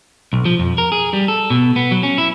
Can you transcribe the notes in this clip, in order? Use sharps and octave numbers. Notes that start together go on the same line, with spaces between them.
B1
F3
F2
A#4
G#4
G3
A4
B2
B3
F#3
C#4
E4